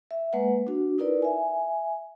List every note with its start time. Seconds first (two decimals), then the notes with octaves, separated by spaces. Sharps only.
0.11 E5
0.33 G#3 A#3 B4 F#5
0.67 D4 F#4
0.98 D#4 E4 A#4 B4 D5
1.22 E5 G#5